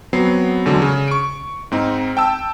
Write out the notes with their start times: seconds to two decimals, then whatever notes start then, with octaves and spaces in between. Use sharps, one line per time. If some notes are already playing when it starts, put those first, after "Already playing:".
0.13 F#3 B3 C4 C7
0.65 E2 D3 F#3 G#3
0.82 C#3
1.08 C#6 D7
1.71 G#2 C4 D#4
2.17 G5 A5 E6